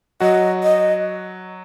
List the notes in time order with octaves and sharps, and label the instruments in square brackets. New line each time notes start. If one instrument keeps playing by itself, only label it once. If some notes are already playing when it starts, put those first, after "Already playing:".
[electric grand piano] F#3 F#4 [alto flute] D#5
[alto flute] D#5